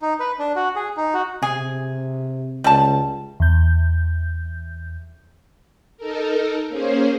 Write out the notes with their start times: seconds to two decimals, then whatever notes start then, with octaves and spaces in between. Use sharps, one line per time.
0.02 D#4
0.20 B4
0.39 D4
0.56 F#4
0.76 G#4
0.97 D#4
1.14 F#4
1.42 C3 G#4
2.64 C#2 G3 A5
3.40 E2 G6
5.97 D#4 A4 A#4
6.68 A#3 C#4 G#4 C5